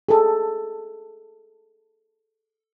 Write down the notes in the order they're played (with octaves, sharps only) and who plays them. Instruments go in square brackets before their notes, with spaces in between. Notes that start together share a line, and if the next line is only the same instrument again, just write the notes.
[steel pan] G#4 A4